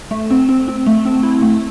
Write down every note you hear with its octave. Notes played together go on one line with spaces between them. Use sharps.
A3
C4
C4
C4
A3
C4
E4
A3